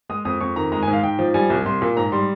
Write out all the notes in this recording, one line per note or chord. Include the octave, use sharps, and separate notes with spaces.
G#3 D#6
F2 D#6
F2 C#6
D#3 A#5
G#3 A#5
G#5
G#2
F5
G#2 G5
F3
G3 G#5
C2
C2 C6
A#2
G#2 A#5
G3 C6